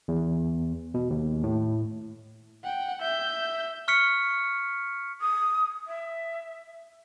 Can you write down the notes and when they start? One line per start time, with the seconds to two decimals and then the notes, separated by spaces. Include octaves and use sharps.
0.08 E2
0.94 B2
1.10 D#2
1.44 A2
2.64 F#5 G5
3.02 E5 G6
3.88 C#6 F6 B6 C#7
5.21 D#6
5.87 E5